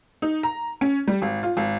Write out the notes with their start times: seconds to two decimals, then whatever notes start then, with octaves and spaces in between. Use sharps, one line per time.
0.22 D#4
0.43 A#5
0.81 C#4
1.07 G3
1.22 G#1
1.43 F4
1.57 G#1